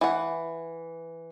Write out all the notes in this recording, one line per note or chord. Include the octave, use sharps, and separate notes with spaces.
E3 F#5